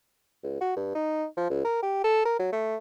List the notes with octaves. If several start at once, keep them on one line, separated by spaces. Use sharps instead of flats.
C#2
F#4
G2
D#4
F3
C#2
A#4
G4
A4
A#4
F#3
A3